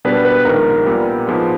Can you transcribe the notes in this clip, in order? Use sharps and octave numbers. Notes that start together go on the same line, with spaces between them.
B2 G3 B3 D4 B4
B4
A#1 G#2 D#3 A#4
A#2 G3 B3
G#2 F3 G#3 B3